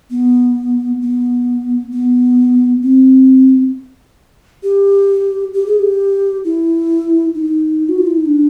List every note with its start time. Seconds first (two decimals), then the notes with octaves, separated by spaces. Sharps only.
0.11 B3
1.01 B3
1.92 B3
2.82 C4
4.63 G4
5.54 G4
5.67 G#4
5.79 G4
6.45 E4
7.35 D#4
7.89 F#4
7.98 F4
8.07 E4
8.17 D#4
8.26 D4